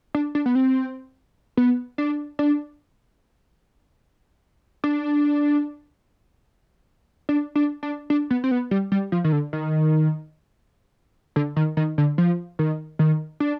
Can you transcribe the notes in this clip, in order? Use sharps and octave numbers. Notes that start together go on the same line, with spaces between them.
D4
D4
B3
C4
B3
D4
D4
D4
D4
D4
D4
D4
B3
C4
B3
G3
G3
F3
D#3
D3
D#3
D3
D#3
D#3
D3
F3
D#3
D#3
D4